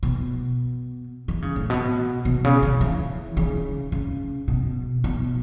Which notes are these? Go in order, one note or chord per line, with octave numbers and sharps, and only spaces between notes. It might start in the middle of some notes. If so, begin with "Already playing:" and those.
B2
E3
C#3
A2
B2
B2
C#3
C#3
E3
C#3
C#3
B2
B2